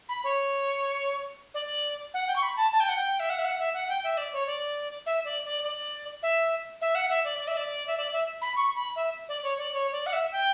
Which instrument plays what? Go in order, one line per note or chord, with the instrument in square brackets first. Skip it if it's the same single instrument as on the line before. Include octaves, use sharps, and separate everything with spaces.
[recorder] B5
C#5
D5
F#5
G5
C#6
B5
A5
A5
G5
F#5
G5
E5
F#5
E5
F#5
E5
F#5
G5
E5
D5
C#5
D5
E5
D5
D5
D5
E5
E5
F#5
E5
D5
D5
E5
D5
E5
D5
E5
B5
C#6
B5
E5
D5
C#5
D5
C#5
D5
F#5
E5
G5